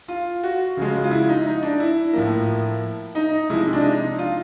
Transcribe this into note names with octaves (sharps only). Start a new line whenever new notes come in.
F4
F#4
C#3 F3 G#3
F4
E4
D#4
D#4
D4
E4
A2 F3 A#3
D#4
C3 F3 G#3 E4
D#4
D4
D#4
F4